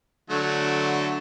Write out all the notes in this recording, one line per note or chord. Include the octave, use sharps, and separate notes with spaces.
D3 F#3 A3